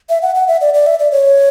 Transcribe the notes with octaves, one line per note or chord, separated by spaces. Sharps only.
E5
F#5
F#5
E5
D5
D5
E5
D5
C#5